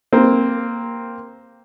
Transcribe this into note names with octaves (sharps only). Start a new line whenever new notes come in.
A#3 C4